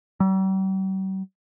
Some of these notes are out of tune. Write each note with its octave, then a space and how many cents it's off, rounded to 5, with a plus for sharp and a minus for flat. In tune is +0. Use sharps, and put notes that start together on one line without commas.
G3 -45